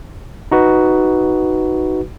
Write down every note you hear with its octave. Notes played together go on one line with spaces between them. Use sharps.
D#4 F#4 B4